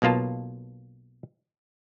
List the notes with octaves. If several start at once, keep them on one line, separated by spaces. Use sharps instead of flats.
B1 B2 A#3 F4 A5